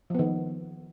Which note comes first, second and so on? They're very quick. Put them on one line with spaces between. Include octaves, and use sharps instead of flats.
F3 B3 D#3